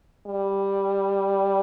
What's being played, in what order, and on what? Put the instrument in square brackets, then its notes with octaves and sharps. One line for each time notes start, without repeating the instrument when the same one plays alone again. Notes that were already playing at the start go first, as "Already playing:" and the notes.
[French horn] G3